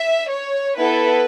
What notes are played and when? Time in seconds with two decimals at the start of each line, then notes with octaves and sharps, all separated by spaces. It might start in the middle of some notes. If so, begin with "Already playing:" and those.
Already playing: E5
0.29 C#5
0.77 B3 E4 A4 B4